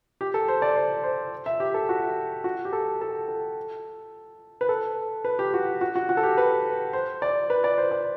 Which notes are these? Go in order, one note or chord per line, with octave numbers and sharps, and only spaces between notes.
G4
A4
C5
D5
C5
C5
E5
G4
A4
F#4
F#4
G4
A4
A4
A4
B4
A4
B4
G4
F#4
F#4
F#4
F#4
A4
G4
B4
C5
D5
B4
D5
C5
D5